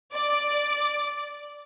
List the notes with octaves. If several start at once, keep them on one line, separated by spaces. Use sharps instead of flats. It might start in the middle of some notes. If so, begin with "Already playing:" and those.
D5 D6